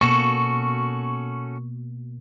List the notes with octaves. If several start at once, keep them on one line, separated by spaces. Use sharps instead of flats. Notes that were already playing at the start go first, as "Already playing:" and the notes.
B2 A#3 C#4 F#4 A4 C#6